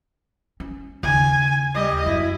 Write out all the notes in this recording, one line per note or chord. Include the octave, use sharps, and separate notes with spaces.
C#4
D#2 C#3 G#5
G3 D#5
F#2 E4